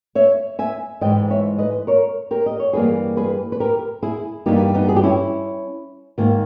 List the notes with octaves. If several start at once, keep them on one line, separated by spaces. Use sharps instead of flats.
C#5 E5
E5 G#5
G#2 E3 G#3 D#5 G5
C#5 E5
B4 D#5
A#4 C#5
G4 A#4
D#5
C#5
G2 E3 G3 A#3 G#4 B4
G#4 B4
B4
G4 A#4
E4 G#4
G2 E3 G3 A#3 D#4 G4
B3 D#4
G#4
G4
C#4 E4
G#2 D#3 A#3